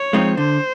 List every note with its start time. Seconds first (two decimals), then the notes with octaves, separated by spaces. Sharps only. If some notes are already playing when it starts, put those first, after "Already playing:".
Already playing: C#5
0.13 F3 G#3 C4 D#4
0.37 D3 C5